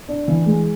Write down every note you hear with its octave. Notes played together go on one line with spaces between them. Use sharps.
D4
E3
G#3